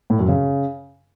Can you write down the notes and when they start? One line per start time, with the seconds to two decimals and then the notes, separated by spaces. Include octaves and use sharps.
0.10 A2
0.19 F#2
0.28 C#3